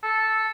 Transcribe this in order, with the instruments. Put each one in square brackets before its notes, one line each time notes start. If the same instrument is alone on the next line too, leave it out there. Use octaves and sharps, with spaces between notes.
[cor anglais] A4